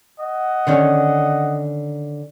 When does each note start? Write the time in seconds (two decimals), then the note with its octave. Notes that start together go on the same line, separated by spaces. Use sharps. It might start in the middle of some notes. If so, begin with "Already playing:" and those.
0.20 D#5 F#5
0.67 D3 D#3 C#4